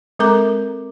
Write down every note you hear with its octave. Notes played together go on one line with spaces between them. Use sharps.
G#3 C4 A4 A#4 A#5 D6